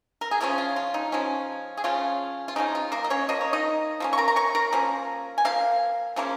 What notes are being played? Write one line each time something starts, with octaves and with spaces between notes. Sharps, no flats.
A#4
G#4
C#3 F3 C#4 F4
F4
F4
D#4
C#3 F3 C#4
G#4
C#3 F3 C#4 F4
F4
C#3 F3 C#4 D#4
F4
A#3 A#4
D#5
C#4 C#5
F3 A#3 D#5
C#5
D#4 D#5
F3 A#3 C#4
C#6
A#4 A#5
A#5
C#5 C#6
A#4 A#5
F3 A#3 C#4
G#5
F3 A#3 F5
C#3 F3 A#3 C#4